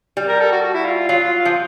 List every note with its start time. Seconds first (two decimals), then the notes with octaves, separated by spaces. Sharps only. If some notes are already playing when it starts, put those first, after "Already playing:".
0.17 G3
0.28 A#4
0.40 A4
0.51 F#4
0.62 F#4
0.74 E4
0.85 F4
1.08 F#3 F4
1.24 F4
1.39 F4
1.45 F3